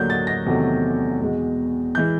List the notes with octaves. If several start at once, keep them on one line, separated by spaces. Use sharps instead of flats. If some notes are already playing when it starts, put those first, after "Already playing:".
Already playing: D#2 D3 F#3 A#3 G6
A6
A#6
E2 C3 D#3 F#3 A3
E2 B2 G#3
G6
E3 G#3